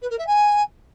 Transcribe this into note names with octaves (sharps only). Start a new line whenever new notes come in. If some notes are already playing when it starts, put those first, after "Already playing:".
B4
A#4
E5
G#5